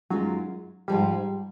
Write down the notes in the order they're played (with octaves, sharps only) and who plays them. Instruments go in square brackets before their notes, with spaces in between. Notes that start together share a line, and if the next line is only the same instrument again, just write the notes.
[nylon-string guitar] F#2 D#3 G#3 C#4 F4 [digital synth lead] F#3
[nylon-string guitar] G#2 F3 G#3 [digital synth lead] G3